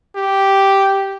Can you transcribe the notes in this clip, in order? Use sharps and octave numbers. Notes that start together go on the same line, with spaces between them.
G4